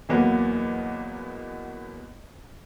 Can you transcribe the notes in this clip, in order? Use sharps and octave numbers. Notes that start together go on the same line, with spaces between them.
E2 B2 F#3 A#3 B3